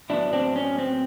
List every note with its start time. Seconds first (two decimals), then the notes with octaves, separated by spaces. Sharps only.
0.10 A2 F#3 B3 D4 E4
0.33 C4 D4
0.56 C#4
0.78 C4